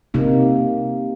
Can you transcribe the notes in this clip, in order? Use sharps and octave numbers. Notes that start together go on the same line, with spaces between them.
C3 A#3 D#4